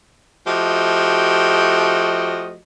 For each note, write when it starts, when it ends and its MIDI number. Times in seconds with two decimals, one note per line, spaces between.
0.47 2.57 53
0.47 2.57 57
0.47 2.57 66
0.47 2.57 67
0.47 2.57 75